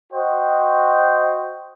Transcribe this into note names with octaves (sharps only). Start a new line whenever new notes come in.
F#4 C5 D#5 G5